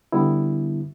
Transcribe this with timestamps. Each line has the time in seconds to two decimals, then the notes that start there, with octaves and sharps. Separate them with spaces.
0.12 D3 G3 B3 E4